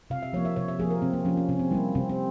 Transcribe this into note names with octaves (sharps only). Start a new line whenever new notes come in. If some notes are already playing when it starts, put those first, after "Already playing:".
C3 F5
E5
F3 A#3 C#5
E5
C3 C#5
E5
F3 A#3 G#4
A#4
C3 C4
A#3
F3 A#3 C#4
C#4
C3 C#4
C4
G3 A#3 E4
C3 C4
C4